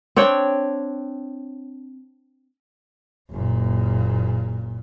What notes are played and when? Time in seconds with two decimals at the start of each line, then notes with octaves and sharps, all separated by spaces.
0.17 C4 D4 C#5 G5
3.30 F#1 A#2